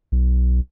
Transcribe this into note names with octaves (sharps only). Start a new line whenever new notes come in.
B1